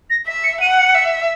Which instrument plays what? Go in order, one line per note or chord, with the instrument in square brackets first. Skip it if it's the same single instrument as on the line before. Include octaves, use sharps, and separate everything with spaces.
[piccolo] A#6
[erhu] E5 [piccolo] B6
[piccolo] C#7
[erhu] F#5 [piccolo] D#7
[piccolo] C#7
[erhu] E5